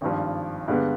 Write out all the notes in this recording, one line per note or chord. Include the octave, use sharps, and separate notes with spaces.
G#1 G2 F3
G2 D3 G#3 B3